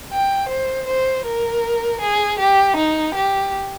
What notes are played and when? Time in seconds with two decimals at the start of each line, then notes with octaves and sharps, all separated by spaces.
0.11 G5
0.49 C5
0.87 C5
1.26 A#4
2.01 G#4
2.39 G4
2.76 D#4
3.15 G4